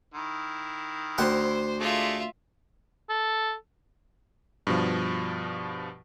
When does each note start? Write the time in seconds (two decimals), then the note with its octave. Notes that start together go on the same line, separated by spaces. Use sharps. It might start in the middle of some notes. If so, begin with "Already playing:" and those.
0.14 D#3 E4
1.18 D2 C5 F#5 G5
1.80 G#3 A3 F4 D5 E5
3.09 A4
4.67 G2 B2 F3